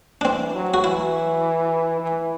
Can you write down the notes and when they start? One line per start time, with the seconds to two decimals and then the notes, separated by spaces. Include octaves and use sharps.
0.21 D4
0.25 E3 C4
0.55 F#3
0.74 F#4
0.83 E3 E4
2.00 E3